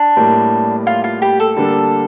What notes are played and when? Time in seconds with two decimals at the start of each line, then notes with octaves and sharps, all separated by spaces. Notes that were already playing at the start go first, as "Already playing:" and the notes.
Already playing: D4
0.17 A2 G3 A#3
0.87 F4
1.04 F4
1.22 G4
1.40 A4
1.57 D3 G3 A#3 D4